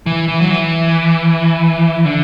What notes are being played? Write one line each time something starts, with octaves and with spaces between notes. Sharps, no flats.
E3
E3
F#3
E3
D3